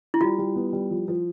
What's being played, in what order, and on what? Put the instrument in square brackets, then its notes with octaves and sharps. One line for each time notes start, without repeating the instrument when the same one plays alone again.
[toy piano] E4
[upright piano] G3 [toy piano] F4
[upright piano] G3
B3
G3
F3
F3